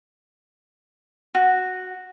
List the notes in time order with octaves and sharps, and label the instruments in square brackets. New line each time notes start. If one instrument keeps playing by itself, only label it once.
[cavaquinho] F#4